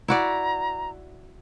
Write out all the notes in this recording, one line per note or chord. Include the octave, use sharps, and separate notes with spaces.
E4 F#4 D5 A#5